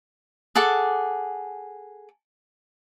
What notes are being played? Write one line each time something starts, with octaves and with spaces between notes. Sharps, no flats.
G#4 A4 F#5 D6